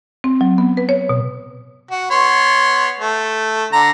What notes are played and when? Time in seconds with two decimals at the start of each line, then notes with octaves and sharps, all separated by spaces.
0.24 C4
0.41 F#3
0.58 B3
0.77 B4
0.89 C#5
1.09 B2
1.91 F#4
2.11 B3 C#5 C6
3.00 A3
3.73 D3 A#5